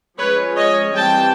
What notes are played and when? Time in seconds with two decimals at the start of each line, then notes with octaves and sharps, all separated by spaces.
0.18 F3 G#3 C#4 B4 C#5
0.57 C#5 D#5
0.95 E3 G3 C4 G5 A5